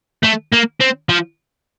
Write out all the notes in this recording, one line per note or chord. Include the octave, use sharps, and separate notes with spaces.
A3
A#3
C4
F3